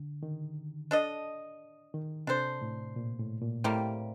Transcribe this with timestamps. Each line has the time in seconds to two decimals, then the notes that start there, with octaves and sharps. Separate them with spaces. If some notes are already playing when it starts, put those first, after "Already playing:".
Already playing: D3
0.23 D#3
0.91 D4 A4 D#5
1.94 D#3
2.27 C3 D4 A4 C5
2.62 A2
2.96 A#2
3.19 A2
3.42 A#2
3.64 A2 C3 G3 A#3